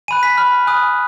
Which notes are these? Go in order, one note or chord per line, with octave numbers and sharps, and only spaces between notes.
G#5 B5 F#6 D#7
B6
B5 F6
G#5 B5 D#6 F#6